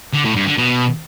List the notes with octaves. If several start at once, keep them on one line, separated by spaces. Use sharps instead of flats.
D3
A2
G2
D3
B2